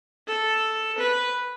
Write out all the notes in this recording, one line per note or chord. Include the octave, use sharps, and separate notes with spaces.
A4
B4